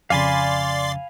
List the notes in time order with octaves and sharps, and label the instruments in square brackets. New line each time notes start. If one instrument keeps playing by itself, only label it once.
[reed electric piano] F2 C#3 [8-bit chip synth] D5 C6 A6 [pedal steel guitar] F5 G#5 B5